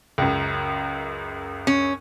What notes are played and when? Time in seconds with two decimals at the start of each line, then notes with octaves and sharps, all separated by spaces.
0.18 C#2 F#2
1.67 C#4